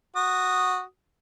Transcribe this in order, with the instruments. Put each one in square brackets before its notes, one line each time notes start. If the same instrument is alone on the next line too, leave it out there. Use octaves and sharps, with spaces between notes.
[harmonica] F#4 D#6